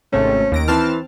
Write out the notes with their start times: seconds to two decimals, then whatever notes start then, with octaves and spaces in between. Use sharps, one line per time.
0.13 G#1 C3 A3 C#4
0.52 D#2 A#6 D7
0.68 E3 C4 A5 F6